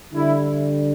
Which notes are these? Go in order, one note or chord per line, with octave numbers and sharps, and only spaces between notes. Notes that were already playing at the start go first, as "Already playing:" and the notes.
D3 G3 E4